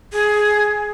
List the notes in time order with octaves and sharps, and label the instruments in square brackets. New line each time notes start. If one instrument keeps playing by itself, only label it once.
[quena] G#4